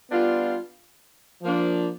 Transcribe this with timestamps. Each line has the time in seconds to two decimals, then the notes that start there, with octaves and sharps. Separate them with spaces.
0.10 G3 B3 D4 F4
1.41 F3 A#3 D4